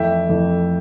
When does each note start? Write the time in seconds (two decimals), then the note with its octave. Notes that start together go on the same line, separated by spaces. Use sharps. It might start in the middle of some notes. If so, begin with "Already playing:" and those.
Already playing: F2 E3 A3 E5 G5
0.29 F2 E3 A3